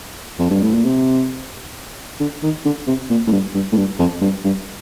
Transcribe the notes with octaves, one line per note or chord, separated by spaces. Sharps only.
F2
G2
A2
A#2
C3
D3
D#3
D3
C3
A#2
A2
G2
G2
A2
G2
F2
G2
G2